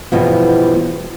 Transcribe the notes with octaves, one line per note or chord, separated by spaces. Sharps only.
E2 G2 B2 F3